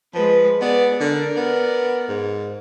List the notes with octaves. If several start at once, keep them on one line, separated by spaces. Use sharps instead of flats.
F3 G#3 B4
B3 G#4 D5
D3 A#4 D5
B3
G#2